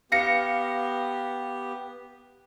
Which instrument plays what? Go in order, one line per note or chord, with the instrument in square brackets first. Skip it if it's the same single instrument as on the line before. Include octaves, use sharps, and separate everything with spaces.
[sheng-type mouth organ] B3 G4 [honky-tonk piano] F5 A#6 C#7